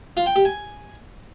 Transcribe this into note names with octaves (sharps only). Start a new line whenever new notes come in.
F4
G5
G4
G#5